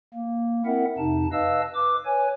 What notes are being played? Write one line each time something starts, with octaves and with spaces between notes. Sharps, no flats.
A#3
C4 E4 A#4 E5 F#5
F2 C3 D#4 A5
B4 D#5 F5 A5 E6
B4 D6
B4 C#5 G#5